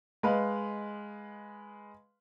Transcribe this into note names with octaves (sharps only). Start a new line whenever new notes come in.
G#3 B4 F5